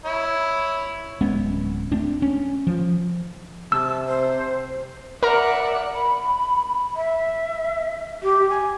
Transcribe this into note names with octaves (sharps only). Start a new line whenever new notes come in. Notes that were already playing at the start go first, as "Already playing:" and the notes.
E4 C#5
D1 G#3 B3 C#4
A3 C4 D4
C#4
F3
C3 A5 E6
C5
A#4 D5 E5 F#5 A#5
B5
E5
G4
G#5